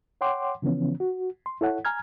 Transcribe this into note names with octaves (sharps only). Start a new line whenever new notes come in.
C#5 F#5 G5 C6 D6
C#3 E3 F3 B3 C#4
F#4
C6
E4 A4 C#5 F#5
G#5 A#5 F6 G#6